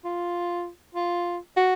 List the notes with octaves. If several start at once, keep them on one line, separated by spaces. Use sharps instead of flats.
F4
F4
F#4